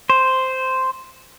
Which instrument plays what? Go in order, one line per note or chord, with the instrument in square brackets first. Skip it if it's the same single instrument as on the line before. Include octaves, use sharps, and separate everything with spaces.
[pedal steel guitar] C5